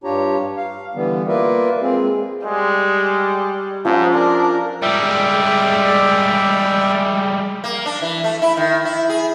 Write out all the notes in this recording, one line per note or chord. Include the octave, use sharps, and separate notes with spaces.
G2 D4 F4 G4 C#5 A#5
F5
D3 E3 G3 B3
A#3 F4 A#4 B4 D5 E5
G#3 C4 F4 G#4
G3 G#3
G#2 F3 C#4 D5
D4 A#4
G3 G#3 D5 E5 G5
A#3
D4
E3
A3
E4
D#3
E4
G#4